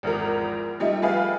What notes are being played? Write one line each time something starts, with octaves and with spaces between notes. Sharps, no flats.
G#1 E2 F3 A#4
F3 G3 A3 D#4 E4
G3 A3 G#4 B4 F5